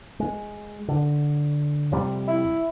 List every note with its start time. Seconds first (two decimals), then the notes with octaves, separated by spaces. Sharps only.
0.20 G#3
0.88 D3
1.92 F2 C3 G3
2.27 E4